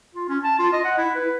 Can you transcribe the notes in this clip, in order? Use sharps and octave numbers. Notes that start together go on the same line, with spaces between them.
F4
C#4
A5
F4
D#5
F#5
E4
B4